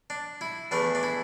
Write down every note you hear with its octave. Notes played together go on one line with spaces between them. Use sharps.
D4
E4
E2 E3 A3 D4
D4
E4